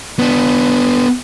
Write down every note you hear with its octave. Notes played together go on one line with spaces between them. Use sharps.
B3 D4